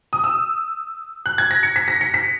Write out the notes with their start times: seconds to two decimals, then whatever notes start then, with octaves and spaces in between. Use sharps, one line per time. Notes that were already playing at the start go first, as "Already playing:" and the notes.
0.13 D#6
0.24 E6
1.26 F#6
1.38 G#6
1.51 A#6
1.63 C#7
1.76 B6
1.88 A#6
2.01 C#7
2.14 B6